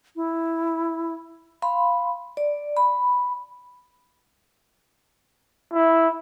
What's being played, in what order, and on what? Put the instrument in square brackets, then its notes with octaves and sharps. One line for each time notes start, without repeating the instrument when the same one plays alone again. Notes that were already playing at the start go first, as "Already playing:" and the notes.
[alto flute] E4
[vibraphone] F5 B5 C6
D5
B5
[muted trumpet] E4